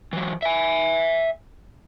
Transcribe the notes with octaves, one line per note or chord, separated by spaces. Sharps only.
E3 F#3
E5 G#5